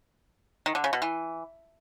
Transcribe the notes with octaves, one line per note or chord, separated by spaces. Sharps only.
D#3
D3
C#3
B2
E3